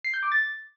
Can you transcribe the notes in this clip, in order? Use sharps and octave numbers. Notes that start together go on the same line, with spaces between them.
C7
G6
D6
A6